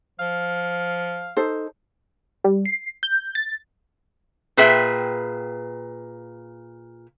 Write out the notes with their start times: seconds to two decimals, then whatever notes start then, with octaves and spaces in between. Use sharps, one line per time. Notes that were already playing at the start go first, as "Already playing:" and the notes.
0.20 F3 F5
1.37 D#4 A4 C5
2.44 G3
2.65 C7
3.03 G6
3.35 A6
4.57 A#2 G#4 B4 E5 G5